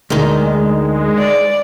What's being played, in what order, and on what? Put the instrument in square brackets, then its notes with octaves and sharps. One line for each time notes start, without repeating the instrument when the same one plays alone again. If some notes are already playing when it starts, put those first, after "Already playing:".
[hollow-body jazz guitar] D2 [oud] D#3 D#4 [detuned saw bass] G#3
[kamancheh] D5